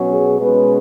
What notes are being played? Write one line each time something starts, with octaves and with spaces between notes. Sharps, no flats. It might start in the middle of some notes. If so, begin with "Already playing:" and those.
Already playing: B2 F#3 C#4
G#4
B2 G#3 C#4 B4